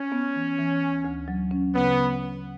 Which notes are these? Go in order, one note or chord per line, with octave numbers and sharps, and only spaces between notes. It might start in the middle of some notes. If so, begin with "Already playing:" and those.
Already playing: C#4
B3
E3
E3
D2
D2
F#3
C#4
C#3 B3